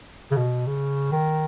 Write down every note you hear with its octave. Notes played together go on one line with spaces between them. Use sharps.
C#3
B2
C#3
D#3